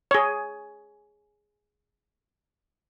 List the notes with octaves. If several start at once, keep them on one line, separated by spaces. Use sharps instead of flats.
G#4 C#5